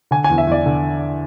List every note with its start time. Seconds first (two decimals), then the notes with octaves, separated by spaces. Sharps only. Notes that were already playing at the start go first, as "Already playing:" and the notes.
0.11 D3 G#5
0.24 G#5
0.30 E2
0.38 E5
0.47 E2 D5
0.66 D3